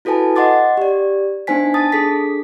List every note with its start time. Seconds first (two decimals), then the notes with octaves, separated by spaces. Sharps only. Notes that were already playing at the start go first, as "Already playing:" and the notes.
0.05 E4 F#4 A4 B4 G#5 A5
0.36 D#5 F#5 C6 D6 A6
0.77 G4 D5
1.47 B3 D4 D#4 C5 G#5 B6
1.74 A5 D#6 A6
1.92 D4 G#4 A4 B6